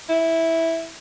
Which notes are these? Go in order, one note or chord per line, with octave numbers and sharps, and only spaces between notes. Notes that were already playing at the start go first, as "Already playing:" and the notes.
E4